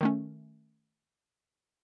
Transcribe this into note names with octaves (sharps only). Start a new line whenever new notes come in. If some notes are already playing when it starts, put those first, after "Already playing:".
D#3 A3 C#4